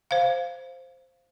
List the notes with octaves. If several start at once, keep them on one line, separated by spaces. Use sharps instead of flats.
C5 F5